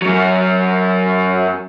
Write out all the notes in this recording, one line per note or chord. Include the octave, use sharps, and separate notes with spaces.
F#2 F#3